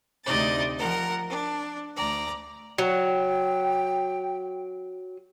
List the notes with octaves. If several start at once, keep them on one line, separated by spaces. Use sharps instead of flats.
D2 C3 D#4 D5 D#5 A6
F3 A#4 F#5
D4
D2 D5 A#5
F#3 G5